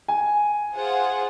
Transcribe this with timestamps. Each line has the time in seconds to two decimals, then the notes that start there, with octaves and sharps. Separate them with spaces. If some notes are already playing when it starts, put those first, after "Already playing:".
0.08 G#5
0.75 F4 G#4 C5 F#5